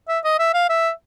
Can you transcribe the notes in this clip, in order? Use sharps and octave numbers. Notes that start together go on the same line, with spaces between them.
E5
D#5
E5
F5
E5